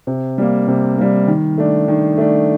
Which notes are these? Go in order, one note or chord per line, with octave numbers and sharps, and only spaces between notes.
C3
G3 A#3
C3
G3 A#3
D#3
A3 D4
D#3
A3 D4